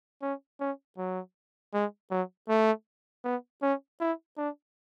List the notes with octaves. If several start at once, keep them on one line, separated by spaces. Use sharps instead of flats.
C#4
C#4
F#3
G#3
F#3
A3
B3
C#4
E4
D4